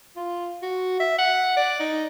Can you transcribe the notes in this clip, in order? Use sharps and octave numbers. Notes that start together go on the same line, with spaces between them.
F4
F#4
E5
F#5
D5
D#4